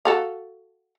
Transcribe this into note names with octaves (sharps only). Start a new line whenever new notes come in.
F#4 A4 F5